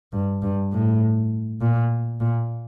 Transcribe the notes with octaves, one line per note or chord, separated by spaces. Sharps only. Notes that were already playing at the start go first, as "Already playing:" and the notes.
G2
G2
A2
A#2
A#2